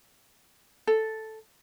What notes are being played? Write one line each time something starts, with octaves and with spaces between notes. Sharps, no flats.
A4